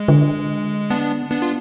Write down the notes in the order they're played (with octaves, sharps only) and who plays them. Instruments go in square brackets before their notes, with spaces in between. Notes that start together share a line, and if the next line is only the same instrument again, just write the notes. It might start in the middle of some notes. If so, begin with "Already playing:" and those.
Already playing: [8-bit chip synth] G#3
[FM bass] D3
[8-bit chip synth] B3 D4
B3 D4
F4